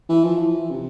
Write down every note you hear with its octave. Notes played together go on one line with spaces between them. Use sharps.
E3
F3
E3
C3